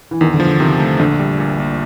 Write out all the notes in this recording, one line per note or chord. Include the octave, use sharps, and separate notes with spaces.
E3
E2 D#3
D3
F3
D3
C3 D#3
A3
A#1 D3
G3
A#2
A#1